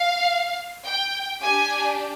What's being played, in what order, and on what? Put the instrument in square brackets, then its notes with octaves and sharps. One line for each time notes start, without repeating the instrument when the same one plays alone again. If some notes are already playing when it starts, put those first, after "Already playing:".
Already playing: [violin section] F5
G5
D4 G4 G#5